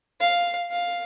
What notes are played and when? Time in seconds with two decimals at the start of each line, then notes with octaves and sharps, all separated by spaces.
0.21 F5
0.72 F5